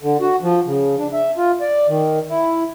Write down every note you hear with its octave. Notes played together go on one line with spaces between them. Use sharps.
D3
F#4
F3
C#3
D4
E5
F4
D5
D#3
E4